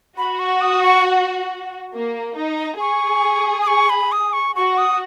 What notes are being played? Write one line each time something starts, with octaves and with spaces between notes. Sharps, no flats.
F#4 B5
C#6
D#6
C#6
A#3
D#4
G#4 C#6
D#6
C#6
B5
D#6
C#6
F#4 C#6
D#6